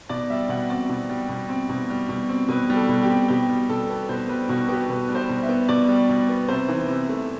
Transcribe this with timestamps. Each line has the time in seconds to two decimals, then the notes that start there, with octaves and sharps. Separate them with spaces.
0.09 B2 D5
0.30 G3 E5
0.49 B2 F#5
0.70 C4 D5
0.89 B2
1.09 G3
1.29 B2
1.49 C4
1.69 B2
1.90 G3
2.09 B2
2.29 C4
2.48 B2 B4
2.70 G3
2.76 A4
2.89 B2
3.02 G4
3.09 C4
3.28 B2 G4
3.49 G3
3.69 B2 A4
3.89 B3
4.09 B2 C5
4.28 G3 B4
4.49 B2 F#4
4.68 B3 G4
4.89 B2 B4
5.08 G3
5.15 C5
5.29 B2
5.43 E5
5.49 B3
5.69 B2 D5
5.89 G3
6.09 B2
6.29 B3
6.48 C3 C5
6.68 E3
6.88 C3
7.09 A3